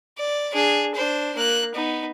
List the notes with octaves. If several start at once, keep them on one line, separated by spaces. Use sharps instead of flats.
D5
D4 G#4
D4 C5
A#3 F#6
B3 D#4